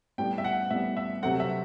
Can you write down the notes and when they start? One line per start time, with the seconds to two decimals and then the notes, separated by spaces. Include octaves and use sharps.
0.18 A2 G3 B3 G5
0.38 E5
0.44 F#5
0.70 A2 G3 B3 E5
0.97 E5
1.22 C3 F#3 A3 C4 F#5
1.40 E5